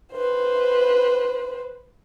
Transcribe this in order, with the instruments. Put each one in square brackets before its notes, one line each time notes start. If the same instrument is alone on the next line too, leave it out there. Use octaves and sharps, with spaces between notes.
[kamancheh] B4 C5